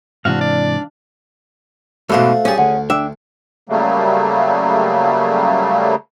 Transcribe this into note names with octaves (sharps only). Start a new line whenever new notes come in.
G#2 C3 E3 D4 F#4 F5
D5
E2 G#2 B2 A3 F#4 A4 C5 F5
G2 C#4 G4 G#4 A5
D2 F#5
D4 E5 G5
C#3 F#3 G3 A3 A#3